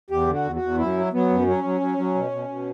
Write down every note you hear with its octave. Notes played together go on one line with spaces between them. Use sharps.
E2 G4
D3
F#4
E2
F#4
E2
F#2 E4
F#3
F#3 B3
F#2
F#3 C#4
F#3
F#3
F#3
B2
B2
B2